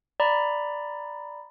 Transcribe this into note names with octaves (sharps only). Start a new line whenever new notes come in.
D5 A#5 B5